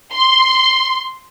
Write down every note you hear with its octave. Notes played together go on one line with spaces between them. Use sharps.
C6